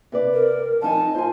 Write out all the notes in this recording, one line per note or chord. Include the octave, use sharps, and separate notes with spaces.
C3 B4 D5
A#4
F2 D#4 G#5 A5
F4 C5 G#5